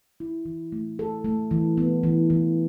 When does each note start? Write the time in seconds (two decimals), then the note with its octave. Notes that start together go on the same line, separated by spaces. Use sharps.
0.20 E4
0.45 E3
0.72 A3
0.99 A4
1.24 A3
1.51 E3
1.78 B3
2.03 E3
2.30 E3